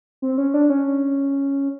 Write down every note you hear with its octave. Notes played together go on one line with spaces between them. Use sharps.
C4
C#4
D4
C#4